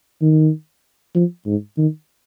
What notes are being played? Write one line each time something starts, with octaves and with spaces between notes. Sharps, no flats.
D#3
F3
G#2
D#3